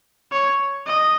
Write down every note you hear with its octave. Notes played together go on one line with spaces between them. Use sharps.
C#5
D#5